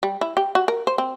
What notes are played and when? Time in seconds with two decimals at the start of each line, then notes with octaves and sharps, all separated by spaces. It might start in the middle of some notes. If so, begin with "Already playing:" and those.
0.03 G3
0.21 E4
0.37 G4
0.55 F#4
0.68 A#4
0.87 C5
0.98 C4